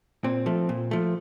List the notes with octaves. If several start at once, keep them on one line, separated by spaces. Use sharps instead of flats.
A#2 C4
F3 A3
A#2
F3 A3